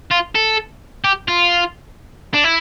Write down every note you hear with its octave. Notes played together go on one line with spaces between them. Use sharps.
F4
A4
G4
F4
D4
E4